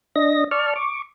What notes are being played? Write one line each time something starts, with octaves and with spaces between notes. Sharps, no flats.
D4 D#5 A#6
D5 A5 C#6 F6
C#6 D6